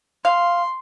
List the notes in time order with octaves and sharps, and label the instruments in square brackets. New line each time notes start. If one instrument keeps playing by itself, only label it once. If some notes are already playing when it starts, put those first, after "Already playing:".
[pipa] F5 [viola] C6